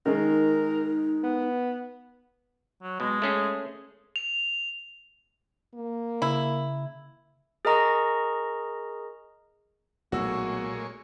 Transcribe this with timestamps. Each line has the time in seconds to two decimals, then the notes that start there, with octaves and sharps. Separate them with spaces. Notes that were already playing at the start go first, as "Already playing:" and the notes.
0.06 D#3 G#3 D#4 A#4
1.23 B3
2.82 F#3
3.00 B2 G#3
3.22 A3 C#4 G#4
4.16 F7
5.74 A#3
6.22 C#3 E4
7.65 G#4 A#4 D#5 A#5 C#6
10.12 B1 A#2 G#3 A3 F#4 C#5 E6